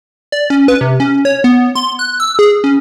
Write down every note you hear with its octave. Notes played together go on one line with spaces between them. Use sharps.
D5
C#4
B4
C3
C#4
C#5
B3
C6
F#6
E6
G#4
C#4